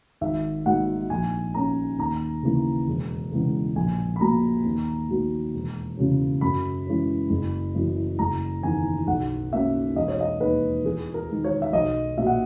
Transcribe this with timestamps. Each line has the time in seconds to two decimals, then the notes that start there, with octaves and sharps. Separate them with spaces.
0.21 G#1 E5
0.65 G#2 F#3 A#3 F#5
1.10 A#1 G#5
1.54 A#2 A#3 C#4 A#5
1.99 D#2 A#5
2.43 C#3 E3 A#3
2.88 E1
3.32 E2 C#3 G#3
3.75 A#1 G#5
4.16 B5
4.21 A#2 F#3 A#3 A#5
4.65 D#2
5.09 D#3 F#3 A#3
5.54 E1
5.97 E2 C#3 F#3 C#4
6.41 F#2 B5
6.87 E3 G#3 C#4
7.30 F#1
7.75 F#2 E3
8.19 F#1 A#5
8.63 E2 D#3 G#5
9.07 B1 F#5
9.52 B2 A#3 C#4 E5
9.96 E1 D#5
10.08 C#5
10.21 D#5
10.40 D#2 D#3 B4
10.84 E2 G#4
11.14 A#4
11.30 D#3 G#3
11.44 C#5
11.62 E5
11.73 B1 D#5
12.17 A#2 E5
12.22 F#3
12.27 F#5